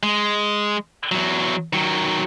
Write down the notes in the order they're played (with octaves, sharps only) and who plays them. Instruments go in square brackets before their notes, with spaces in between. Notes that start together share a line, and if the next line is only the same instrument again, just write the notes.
[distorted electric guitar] G#3
E2 F#3
D#3 F#3